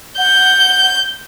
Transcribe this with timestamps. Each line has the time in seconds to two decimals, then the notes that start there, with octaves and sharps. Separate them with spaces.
0.18 F#5 G6